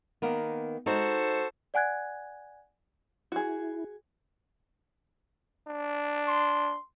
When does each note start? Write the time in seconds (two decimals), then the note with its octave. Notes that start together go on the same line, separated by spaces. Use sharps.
0.22 D#3 A#3 B3
0.86 G#3 D#4 F#4 A4 C5
1.74 D5 F#5 G#5 F#6 G#6
3.32 E4 F#4 G#4
5.68 D4
6.28 C6